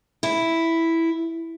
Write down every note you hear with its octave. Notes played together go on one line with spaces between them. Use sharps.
E4